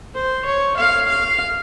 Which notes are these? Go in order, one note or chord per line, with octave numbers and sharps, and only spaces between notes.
C5
C#5
F5
F5